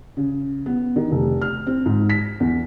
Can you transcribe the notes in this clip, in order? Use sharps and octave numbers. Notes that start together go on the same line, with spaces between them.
C#3
B3
D#3
F1
F6
C4
G#2
B6
E2